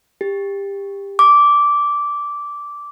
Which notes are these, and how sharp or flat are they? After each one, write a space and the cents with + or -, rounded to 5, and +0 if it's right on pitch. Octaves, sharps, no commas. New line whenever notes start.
G4 +20
D6 -10